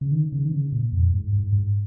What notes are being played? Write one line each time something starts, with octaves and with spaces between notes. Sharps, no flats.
C#3
D#3
C#3
D#3
C#3
A#2
F2
G#2
G#2
G#2